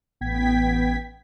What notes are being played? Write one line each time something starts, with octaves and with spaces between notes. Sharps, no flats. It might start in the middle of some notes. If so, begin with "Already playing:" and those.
A1 B3 G5 G#6 B6